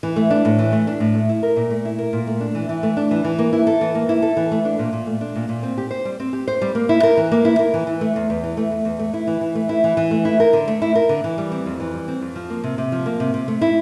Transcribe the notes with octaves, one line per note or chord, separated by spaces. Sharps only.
E3
A3
D4
A2
E3
A3
D4
A2
A3
E4
A#4
A#2
A3
E4
A#4
A#2
A3
D4
E3
E3
A3
D4
E3
E3
A#3
E4
A4
E3
A#3
E4
A4
E3
A3
D4
A#2
A#2
A3
D4
A#2
A#2
C4
G4
C5
G3
C4
G4
C5
G3
A#3
E4
A#4
E3
A#3
E4
A#4
E3
E3
A3
E2
E2
E3
A3
E2
E2
A3
E4
E3
E3
A3
E4
E3
E3
A3
E4
A#4
D3
A3
E4
A#4
D3
E3
G3
C4
F2
E3
G3
C4
F2
F3
A#3
C3
C3
F3
A#3
C3
C3
A3
E4